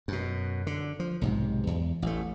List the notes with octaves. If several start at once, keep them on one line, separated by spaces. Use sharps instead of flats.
F#2 B2
D3
F3
B1 G#2 C3
E2
A1 A3